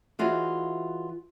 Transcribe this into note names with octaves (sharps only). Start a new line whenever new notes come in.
E3 F4 F#4 G#4 C#5 D#5